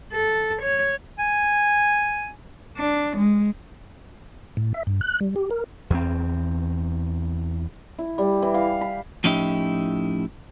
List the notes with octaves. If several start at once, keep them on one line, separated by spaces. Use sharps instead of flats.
A4
C#5
G#5
D4
G#3
A2
E5
G2
F#6
G3
G4
A#4
E2 C4
E4
G3
E3
F5
B5
A2 F3 C#4 D#4 E4 G4